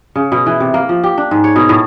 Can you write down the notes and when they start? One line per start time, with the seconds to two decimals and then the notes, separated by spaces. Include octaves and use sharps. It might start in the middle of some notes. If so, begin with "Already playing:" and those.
0.16 C#3
0.32 B2
0.46 E3
0.60 C3
0.74 A#3
0.89 F3
1.04 G4
1.18 D4
1.31 G#2
1.44 C#5
1.56 B2
1.69 A2